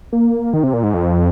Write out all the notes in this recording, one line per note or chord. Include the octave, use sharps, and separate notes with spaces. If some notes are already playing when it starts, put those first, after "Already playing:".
A#3
D#3
C3
A#2
G#2
F2